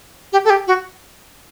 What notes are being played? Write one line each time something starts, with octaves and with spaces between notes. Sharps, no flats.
G4
A4
G4
F#4